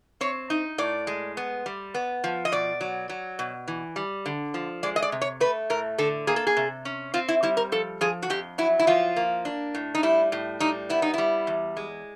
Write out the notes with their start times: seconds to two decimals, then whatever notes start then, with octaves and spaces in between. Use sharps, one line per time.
0.21 C4 C#5
0.50 D#4
0.78 A2 D5
1.07 G#3
1.37 B3
1.66 G3
1.94 B3
2.24 F3
2.45 D#5
2.52 B2 D5
2.81 F#3
3.09 F#3
3.39 B2
3.68 E3
3.96 G3
4.26 D3
4.54 F3
4.83 G#3 D5
4.96 D#5
5.02 D5
5.12 C3
5.21 C#5
5.40 A3 B4
5.70 A2 A#4
5.98 D3 A4
6.27 A#3 G#4
6.36 A4
6.47 G#4
6.57 C3
6.85 C#4
7.14 C4 F4
7.28 E4
7.43 G3 E4
7.57 A#4
7.72 F3 A4
8.01 F3 G#4
8.22 F#4
8.30 F2 G4
8.58 F#3 E4
8.79 E4
8.87 F3 F4
9.16 A#3
9.45 D4
9.75 A2
9.95 D#4
10.03 G3 E4
10.32 A2
10.60 G3 D#4
10.89 B3 E4
11.02 D#4
11.14 G3 E4
11.47 E2
11.77 G#3